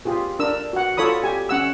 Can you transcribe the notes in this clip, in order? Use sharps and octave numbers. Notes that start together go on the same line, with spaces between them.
F4 G4 G#4
D4 A#4 E6
F#4 F#5
F4 A4 C#5 B5 D#6
G4 G#5
C#4 F#5 E6